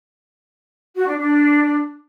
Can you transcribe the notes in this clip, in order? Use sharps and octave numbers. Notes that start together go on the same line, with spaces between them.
F#4
D4
D4